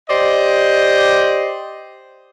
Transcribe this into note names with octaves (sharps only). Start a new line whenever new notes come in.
G4 C5 D5 D#5